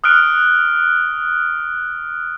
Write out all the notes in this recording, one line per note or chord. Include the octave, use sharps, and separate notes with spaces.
D#6 F6 F#6 D7